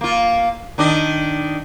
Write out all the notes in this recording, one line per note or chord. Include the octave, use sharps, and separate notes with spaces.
A#3 F4
D#3 D4 D#5